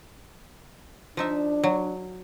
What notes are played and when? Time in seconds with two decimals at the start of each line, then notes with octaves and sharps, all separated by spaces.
1.17 F3 D4 D#4 E5
1.64 F#3